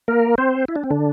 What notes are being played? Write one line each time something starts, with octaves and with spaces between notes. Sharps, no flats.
A#3 A#4
C4 C5
E4
D4
C4
D3 D4